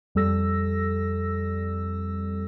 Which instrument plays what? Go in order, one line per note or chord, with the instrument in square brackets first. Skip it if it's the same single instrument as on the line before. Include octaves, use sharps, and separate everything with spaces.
[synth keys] F2 G3 A4 E6 A#6